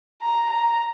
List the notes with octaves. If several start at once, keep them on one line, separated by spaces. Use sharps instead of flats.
A#5
A#5